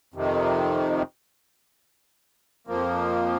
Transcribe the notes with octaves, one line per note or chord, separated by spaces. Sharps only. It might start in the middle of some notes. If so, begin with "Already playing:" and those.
F2 C3 D#3
F2 F3 A#3